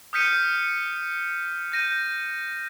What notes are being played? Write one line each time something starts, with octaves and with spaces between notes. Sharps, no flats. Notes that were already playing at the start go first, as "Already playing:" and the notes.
D#6 F6 G6 B6 C#7 D#7
G6 A#6 D#7